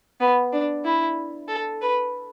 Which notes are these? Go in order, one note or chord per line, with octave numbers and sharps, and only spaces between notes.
B3
D4
E4
A4
B4